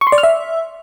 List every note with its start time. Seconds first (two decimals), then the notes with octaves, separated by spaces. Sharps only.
0.01 C#6
0.07 C6
0.12 D5
0.18 F6
0.23 E5